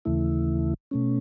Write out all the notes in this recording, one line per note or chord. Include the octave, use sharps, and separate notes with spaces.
D#2 C#3 E3 A3 E4
B2 A3 C#4